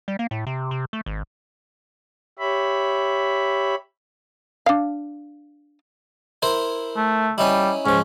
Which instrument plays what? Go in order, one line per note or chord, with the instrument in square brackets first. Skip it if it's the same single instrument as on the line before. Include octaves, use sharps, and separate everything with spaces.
[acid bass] G3
A#3
A2
C3
C3
A3
G#1
[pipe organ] G4 C#5 E5 B5
[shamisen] D4 F5
[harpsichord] E4 A#4 C5
[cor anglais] A3
[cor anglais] G3 [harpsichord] C#4 D#4 E4
[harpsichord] G#2 F3 [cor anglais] C#4